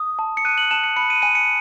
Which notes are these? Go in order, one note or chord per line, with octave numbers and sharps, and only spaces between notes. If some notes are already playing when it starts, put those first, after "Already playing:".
Already playing: D#6
A5
C#7
F#6 D#7
F#7
A5 E7
C#7
B5 C#7
D#7
G#5 D#7
C#7